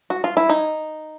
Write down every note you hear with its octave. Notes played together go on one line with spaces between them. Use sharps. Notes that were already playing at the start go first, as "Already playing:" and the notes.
F#4
F4
E4
D#4